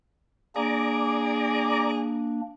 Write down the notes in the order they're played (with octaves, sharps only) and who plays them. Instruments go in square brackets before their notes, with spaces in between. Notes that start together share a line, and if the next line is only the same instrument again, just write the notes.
[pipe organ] A#3 D4 [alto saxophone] G#4 [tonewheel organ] D5 A#5 D6